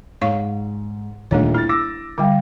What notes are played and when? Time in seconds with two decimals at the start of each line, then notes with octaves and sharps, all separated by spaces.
0.21 G#2 C#5 F5 C#6
1.31 D#1 A3 D4 C#5
1.54 E4 F6 A6
1.69 D6 E6 A#6
2.18 D3 G3 F5 G5 D6